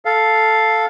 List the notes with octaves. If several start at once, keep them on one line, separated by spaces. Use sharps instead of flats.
A4 F5